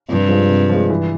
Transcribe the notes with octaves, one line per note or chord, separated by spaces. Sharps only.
G2 C3
F3 G#3
C3
F3 G#3
E3